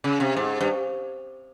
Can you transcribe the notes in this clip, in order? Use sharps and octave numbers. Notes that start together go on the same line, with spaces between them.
C#3
C3
G#2
G2